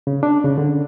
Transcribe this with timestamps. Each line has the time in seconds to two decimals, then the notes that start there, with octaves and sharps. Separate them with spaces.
0.07 C#3
0.23 D4
0.45 C#3
0.58 D3